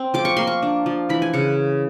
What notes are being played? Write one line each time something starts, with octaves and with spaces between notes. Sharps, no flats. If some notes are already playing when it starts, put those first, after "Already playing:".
Already playing: C4
F3 D6
C#6
A#3 C6
C#6
D4
F3
E3 B5
G#5
C#3 F#5